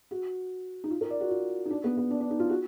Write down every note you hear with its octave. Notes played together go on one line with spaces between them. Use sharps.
F#4
D#4
F4
A#4
D5
F#4
F4
D#4
D4
B3
B3
D4
D4
D#4
F4
F#4